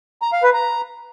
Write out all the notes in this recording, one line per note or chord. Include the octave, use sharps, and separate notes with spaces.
A#5
F5
B4
A#5